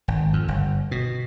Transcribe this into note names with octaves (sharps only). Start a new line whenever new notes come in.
G#1
F2
G1
B2